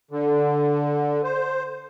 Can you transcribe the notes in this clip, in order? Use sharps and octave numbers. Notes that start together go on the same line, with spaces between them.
D3
C5